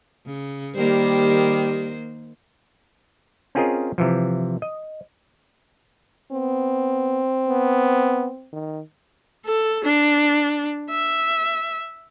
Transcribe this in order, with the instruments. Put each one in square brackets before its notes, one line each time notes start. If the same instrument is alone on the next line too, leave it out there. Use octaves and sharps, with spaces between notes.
[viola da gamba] C#3
[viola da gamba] D#3 A#3 C5 [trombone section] G3 G4
[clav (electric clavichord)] C4 C#4 F4 G#4 A#4 D#5
C3 E3 F3
D#5
[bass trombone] B3 [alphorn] C4
[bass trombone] B3
D#3
[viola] A4
D4
E5